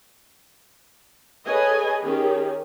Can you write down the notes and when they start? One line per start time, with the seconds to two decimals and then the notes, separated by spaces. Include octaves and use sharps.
1.46 G#4 A4 B4 C#5 D#5 G#5
2.00 D#3 C#4 G4 G#4